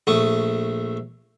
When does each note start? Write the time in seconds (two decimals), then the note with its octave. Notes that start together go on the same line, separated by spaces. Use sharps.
0.07 A#1 A3 C#6 D#6